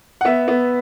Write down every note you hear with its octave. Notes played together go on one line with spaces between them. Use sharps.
F#5
B3 E5
B3